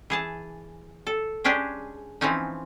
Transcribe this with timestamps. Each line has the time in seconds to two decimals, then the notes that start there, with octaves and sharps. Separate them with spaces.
0.10 E3 G#4 A5
1.07 A4
1.44 G#3 C#4 D4 G4 G#4
2.21 E3 F3 C4 C#4 D#4